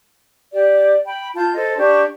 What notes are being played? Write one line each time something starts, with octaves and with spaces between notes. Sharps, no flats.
G4 D5
G5 B5
F4 A5 G6
A4 C5 D#5
D4 G4 C#6